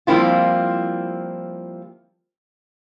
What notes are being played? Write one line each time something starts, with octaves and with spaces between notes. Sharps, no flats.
F3 G3 A#3 C4 E4 F4